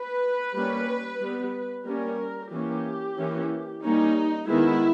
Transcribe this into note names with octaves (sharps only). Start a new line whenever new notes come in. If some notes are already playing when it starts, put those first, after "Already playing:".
Already playing: B4
G3 A#3 C#4
G3 B3
G3 A#3 C#4 A#4
E3 A#3 C#4 G4
E3 A#3 C#4
G3 A#3 C#4 D#4
D#3 G#3 B3 E4